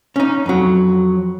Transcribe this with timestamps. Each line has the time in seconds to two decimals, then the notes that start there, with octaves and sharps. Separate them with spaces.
0.16 C#4 D#4
0.46 F2 F#3